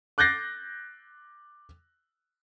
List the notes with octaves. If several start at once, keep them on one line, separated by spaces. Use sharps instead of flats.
D6 F#6 G6 A6 A#6 C7